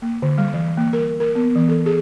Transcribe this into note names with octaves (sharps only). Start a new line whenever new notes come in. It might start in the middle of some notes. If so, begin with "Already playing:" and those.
A#3
D3
G3
E3
A#3
A#4
A#4
B3
E3
A4
G#4